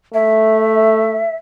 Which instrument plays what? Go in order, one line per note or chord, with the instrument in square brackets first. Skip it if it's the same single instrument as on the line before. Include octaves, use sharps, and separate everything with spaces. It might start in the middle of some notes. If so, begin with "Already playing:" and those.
[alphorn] A3 [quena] E5